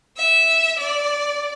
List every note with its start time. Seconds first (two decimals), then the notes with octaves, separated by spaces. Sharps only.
0.17 E5
0.78 D5